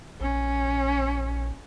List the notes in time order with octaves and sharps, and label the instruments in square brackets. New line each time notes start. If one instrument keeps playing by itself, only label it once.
[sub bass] A#1 [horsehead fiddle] C#4